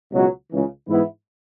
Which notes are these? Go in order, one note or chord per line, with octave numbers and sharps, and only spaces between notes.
C#2 B2 F#3
C#2 C#3 E3
G#2 E3 B3 E4